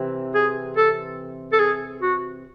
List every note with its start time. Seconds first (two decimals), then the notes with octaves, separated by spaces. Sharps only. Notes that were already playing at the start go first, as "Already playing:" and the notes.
Already playing: C3 E3 C4
0.35 G#4
0.77 A4
1.53 A4
1.59 G#4
2.02 F#4